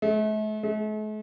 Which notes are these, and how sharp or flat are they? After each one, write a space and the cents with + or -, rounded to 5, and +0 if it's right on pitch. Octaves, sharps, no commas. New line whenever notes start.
A3 -40
A3 -45